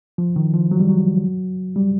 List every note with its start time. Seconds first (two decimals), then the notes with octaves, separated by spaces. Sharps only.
0.18 F3
0.36 D#3
0.54 F3
0.71 F#3
0.80 G3
0.89 F#3
1.76 G3